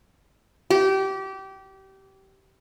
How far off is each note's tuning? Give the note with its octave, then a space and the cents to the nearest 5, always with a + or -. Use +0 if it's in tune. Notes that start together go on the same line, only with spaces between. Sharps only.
G4 -25